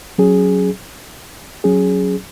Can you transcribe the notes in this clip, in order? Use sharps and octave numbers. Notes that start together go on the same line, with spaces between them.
F#3 C#4 G#4
F#3 C#4 G#4